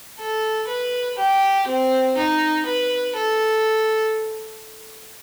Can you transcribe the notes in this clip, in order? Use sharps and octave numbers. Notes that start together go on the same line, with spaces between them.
A4
B4
G4
C4
D#4
B4
A4